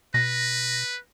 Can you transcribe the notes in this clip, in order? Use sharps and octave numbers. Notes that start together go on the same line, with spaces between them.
B2 B4 A#6